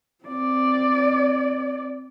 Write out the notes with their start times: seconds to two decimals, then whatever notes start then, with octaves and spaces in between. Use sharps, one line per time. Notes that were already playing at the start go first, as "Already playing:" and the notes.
0.24 C4 D5